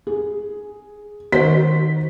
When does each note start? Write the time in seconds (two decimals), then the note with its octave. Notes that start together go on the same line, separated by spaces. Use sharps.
0.07 G#4
1.32 D#3 F#4 C5 B6